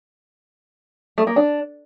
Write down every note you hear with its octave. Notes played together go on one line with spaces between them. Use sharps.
A3
A#3
D4